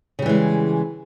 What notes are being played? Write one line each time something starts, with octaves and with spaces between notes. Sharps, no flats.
C#3 E3 G3 G#3